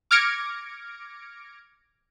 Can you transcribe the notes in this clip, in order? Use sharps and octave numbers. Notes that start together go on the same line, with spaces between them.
D6 F6 G#6 A#6 C#7 D7